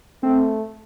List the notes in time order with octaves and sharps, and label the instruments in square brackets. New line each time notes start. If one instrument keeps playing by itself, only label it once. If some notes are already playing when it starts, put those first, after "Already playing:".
[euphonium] A3 [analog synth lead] C4